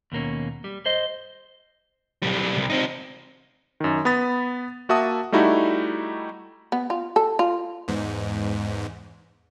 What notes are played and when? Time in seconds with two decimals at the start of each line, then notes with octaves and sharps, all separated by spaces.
0.12 D#2 B2 A#3 C#4
0.64 G3
0.86 C5 D#5
2.23 B1 G3
2.57 C2
2.70 C4 D#4
3.80 F#2 D#3
4.05 B3 B5 D#6 A6
4.89 A#3 F#4 E5 A5 D#6
5.32 G3 A3 D#4 E4 F#4
6.72 B3
6.90 F4
7.16 A4
7.39 F4
7.88 E2 G#2